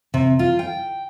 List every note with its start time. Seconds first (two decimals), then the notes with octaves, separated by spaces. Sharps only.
0.14 C3
0.39 F4
0.59 G5